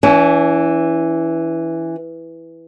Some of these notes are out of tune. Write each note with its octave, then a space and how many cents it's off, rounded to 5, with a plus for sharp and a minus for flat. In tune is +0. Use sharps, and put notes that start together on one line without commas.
E3 +0 C#4 +40